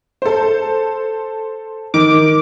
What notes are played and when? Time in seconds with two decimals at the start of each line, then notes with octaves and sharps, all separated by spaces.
0.22 A4 C5
1.94 D#3 D6